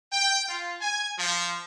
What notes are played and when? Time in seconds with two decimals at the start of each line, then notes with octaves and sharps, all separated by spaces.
0.12 G5
0.46 F4
0.80 G#5
1.17 F3